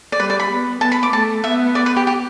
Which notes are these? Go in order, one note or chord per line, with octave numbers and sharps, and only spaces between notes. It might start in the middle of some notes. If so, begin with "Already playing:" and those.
D5
G3 B4
D5
B5
B3
B3 A5
B5
D6
A3 A5
B3 E5
D5
B4
G4
G4